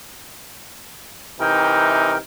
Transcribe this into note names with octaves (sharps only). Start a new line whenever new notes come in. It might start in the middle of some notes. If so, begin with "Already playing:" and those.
C3 E3 D#4 A#4 G5